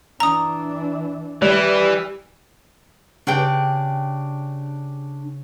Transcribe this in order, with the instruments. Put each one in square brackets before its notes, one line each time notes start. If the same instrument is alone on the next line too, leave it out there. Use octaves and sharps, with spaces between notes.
[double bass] E3 D4 [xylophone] A#5 D#6
[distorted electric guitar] E3 [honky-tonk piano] G3
[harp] C#3 [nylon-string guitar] D4 G4 G5